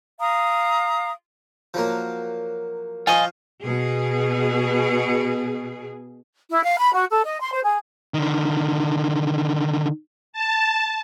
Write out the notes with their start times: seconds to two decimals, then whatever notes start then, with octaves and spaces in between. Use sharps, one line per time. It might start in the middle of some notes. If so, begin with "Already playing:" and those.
0.20 F5 A#5 D#6
1.74 F3 F#3 A#3
3.07 F3 F4 D#5 F5 G#5 C#6
3.61 B2 G#4
6.50 E4
6.63 F5
6.79 B5
6.93 F#4
7.10 A4
7.26 D#5
7.40 C6
7.52 C5
7.64 G#4
8.14 D3 D#3
10.33 A5